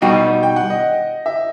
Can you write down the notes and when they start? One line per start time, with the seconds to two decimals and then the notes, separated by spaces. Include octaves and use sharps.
0.02 B2 G3 D#4 F#4 G5
0.43 G5
0.56 F#5
0.70 D#5
1.26 E5